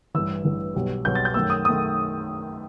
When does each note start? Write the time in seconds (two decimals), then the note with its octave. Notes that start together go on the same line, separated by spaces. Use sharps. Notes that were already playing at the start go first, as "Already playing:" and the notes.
0.14 A1 G2 E3 E6
0.45 A1 G2 E3
0.74 B1 B2 G3
1.05 B1 B2 G3 G6
1.15 A6
1.25 G6
1.34 F#2 D#3 A3 E6
1.50 D#6
1.65 D#3 A3 D#6